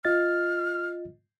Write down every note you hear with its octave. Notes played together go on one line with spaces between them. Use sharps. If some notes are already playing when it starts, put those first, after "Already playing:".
F4 D#5 F6 A6